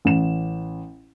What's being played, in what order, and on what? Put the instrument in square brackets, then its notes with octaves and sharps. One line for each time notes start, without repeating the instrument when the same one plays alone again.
[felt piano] A1 E7